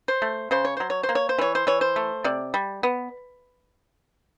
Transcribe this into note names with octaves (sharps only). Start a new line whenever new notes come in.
C5
A3
C#3 C5
C#5
F#3 C5
C#5
C5
A#3
C#5
C5
E3 C#5
C5
E3 C#5
C5
A3
C3 D5
G3
B3